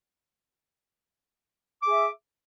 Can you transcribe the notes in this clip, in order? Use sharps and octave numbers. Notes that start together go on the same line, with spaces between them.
G#4 E5 D6